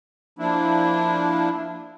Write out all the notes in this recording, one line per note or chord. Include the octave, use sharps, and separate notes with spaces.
F3 A#3 D4 E4